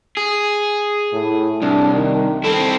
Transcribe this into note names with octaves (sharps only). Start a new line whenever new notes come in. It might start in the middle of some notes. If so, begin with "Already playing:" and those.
G#4
A2
C2 D4
D#3
C4 E4 A4